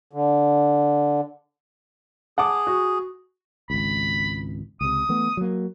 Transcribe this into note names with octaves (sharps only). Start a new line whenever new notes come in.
D3
G#4 F#5 A5 D6
F#4
G#1 C#2 B5
C#2 C3 D#6
E3 A3 B3
F#3 A#3